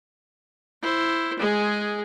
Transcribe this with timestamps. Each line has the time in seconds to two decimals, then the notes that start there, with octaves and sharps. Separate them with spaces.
0.82 E4 C5
1.39 G#3 G#4